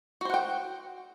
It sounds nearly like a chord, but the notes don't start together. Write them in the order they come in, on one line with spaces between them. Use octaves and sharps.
F#4 C5 F#5 G5